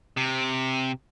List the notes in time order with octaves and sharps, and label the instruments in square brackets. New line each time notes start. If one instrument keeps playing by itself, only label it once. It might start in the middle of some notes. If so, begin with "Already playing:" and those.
[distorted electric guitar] C3